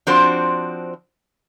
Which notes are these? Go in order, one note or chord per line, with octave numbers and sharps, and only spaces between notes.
F3 C4 D4 F#4 C5